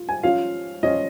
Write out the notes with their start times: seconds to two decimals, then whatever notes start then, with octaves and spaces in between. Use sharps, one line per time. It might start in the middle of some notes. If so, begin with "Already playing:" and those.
Already playing: F4
0.09 G#5
0.23 F3 C#4 F4 F5
0.83 F3 C#4 F4 D#5